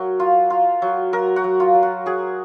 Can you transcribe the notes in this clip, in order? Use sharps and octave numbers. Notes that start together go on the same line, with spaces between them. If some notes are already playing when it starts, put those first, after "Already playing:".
Already playing: F#3 A#4
F4
F4
F#3
F#3 A#4
F#4
F#3
F4
F#3
F#4
F#3 G#4